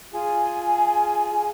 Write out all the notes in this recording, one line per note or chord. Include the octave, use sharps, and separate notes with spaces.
F4 G#4 G#5